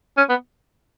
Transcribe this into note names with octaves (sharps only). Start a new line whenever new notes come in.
C#4
B3